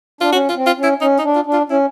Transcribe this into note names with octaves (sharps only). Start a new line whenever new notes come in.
D4 F4
C#4 F#4
F4
C4
F4
C#4
E4
C#4 D#4
D#4
D4
F4
D4
F4
C#4 E4